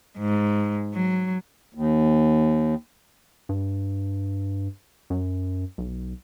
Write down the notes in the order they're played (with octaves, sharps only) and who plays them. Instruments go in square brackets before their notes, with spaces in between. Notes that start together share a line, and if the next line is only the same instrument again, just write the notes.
[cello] G#2
F#3
[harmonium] D#2
[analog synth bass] G2
F#2
B1